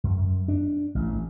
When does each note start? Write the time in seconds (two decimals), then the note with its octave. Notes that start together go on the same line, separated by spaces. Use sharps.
0.04 F#2
0.48 D4
0.95 A1